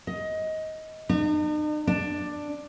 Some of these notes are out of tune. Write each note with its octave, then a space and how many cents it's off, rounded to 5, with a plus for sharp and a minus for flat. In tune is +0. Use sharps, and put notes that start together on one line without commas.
D#5 +20
D#4 -45
D4 +10